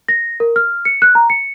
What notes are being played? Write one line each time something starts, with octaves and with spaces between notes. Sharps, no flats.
A#6
A#4
F6
C#7
F#6
A#5
C#7